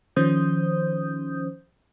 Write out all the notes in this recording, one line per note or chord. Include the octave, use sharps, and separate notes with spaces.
D#3 F3 C#4 C5 D#6 G6